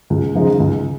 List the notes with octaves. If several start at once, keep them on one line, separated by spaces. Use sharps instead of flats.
C#2
C#3 F3 G#3 D#4
C#2